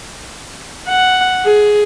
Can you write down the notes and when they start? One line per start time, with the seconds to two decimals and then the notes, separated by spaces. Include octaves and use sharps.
0.89 F#5
1.45 G#4